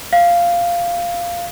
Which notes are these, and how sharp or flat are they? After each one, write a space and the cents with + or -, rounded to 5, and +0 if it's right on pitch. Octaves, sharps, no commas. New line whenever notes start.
F5 -10